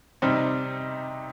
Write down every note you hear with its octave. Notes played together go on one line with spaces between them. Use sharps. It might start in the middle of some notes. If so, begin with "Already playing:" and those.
C3 G3 C4 D#4